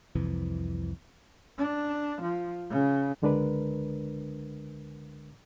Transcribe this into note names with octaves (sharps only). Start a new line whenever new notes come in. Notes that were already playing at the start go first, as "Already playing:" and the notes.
C2 F2 C3 E3
D4
F3
C#3
C#2 D3 G#3 D4 A#4 B4